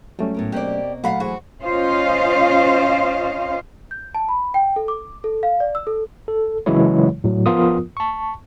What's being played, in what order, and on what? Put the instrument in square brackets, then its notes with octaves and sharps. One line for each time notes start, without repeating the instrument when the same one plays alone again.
[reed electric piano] F#3 A3 C#4 [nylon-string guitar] G3
[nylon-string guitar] A2 B3 A#4
[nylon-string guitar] B2 A#3 C4 [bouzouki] G4 D5
[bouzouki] A#2 F5 F#5 [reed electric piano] F#3 A3 B5
[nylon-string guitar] E3 G#4 C5 [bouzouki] F#4
[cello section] C#4 F4 C5 D#5 F5
[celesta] G6
A5
B5
G5
A4
D6
A4
F5
D5
E6
A4
[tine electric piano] A4
C#3 E3 F#3 G#3 E4 C#5
A2 F#3
F3 B3 F4 A#4 D#6
A5 C#6